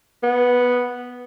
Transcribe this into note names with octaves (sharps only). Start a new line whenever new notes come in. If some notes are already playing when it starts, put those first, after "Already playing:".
B3